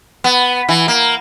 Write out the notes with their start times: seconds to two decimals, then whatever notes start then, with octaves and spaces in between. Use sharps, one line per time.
0.24 B3
0.69 E3
0.88 A#3